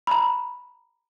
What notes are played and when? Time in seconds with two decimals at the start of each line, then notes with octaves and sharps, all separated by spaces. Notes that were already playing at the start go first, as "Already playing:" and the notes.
0.07 B5
0.11 A#5